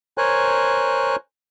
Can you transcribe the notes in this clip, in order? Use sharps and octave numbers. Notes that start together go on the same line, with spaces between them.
A#4 C5 C#5 G#5 F#6